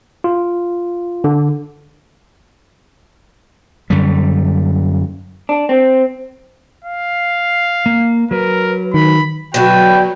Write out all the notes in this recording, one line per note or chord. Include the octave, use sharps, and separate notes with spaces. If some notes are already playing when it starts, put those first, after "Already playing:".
F4
D3
F#2 D3 G3
D4
C4
F5
A#3
F#3 A#4 B4
D#3 B5
B2 D3 F#3 F#4 B4 G5